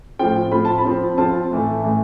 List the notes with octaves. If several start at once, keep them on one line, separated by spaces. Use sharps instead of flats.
A2 F3 C4 F4 G5
A2 F3 C4 F4 B5
A5
B5
F3 C4 F4
F3 C4 F4 A5
A2 E3 A3
A2 E3 A3